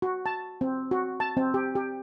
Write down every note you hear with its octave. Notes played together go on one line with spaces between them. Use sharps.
F#4
A5
C4
F#4
A5
C4
G4
G4